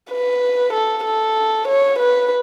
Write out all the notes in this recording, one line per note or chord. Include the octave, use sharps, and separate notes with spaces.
B4
A4
A4
C#5
B4